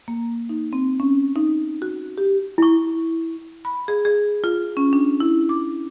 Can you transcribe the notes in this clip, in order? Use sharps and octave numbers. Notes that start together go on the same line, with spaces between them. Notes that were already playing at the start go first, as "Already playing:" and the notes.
A#3
D#4
C4
C#4
D#4
F#4
G4
E4 C#6
B5
G#4
G#4
F4
C#4
D4
E4
D6